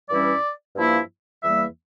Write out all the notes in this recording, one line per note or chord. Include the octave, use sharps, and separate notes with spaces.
G2 E3 G3 C#4 E4 D5
G2 F3 A#3 E4
E2 E3 G3 A#3 E5